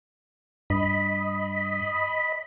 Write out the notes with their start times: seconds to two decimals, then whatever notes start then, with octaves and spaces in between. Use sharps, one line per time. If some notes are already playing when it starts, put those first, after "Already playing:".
0.70 G2 D#5 B5